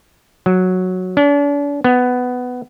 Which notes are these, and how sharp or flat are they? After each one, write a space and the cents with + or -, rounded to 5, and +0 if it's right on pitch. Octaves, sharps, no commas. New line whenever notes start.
F#3 -10
D4 -40
B3 +10